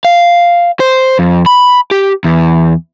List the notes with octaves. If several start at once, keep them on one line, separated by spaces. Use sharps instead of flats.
F5
C5
F2
B5
G4
E2